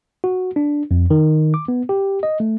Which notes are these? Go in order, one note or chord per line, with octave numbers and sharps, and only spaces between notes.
F#4
D4
F2
D#3
D6
B3
G4
D#5
A3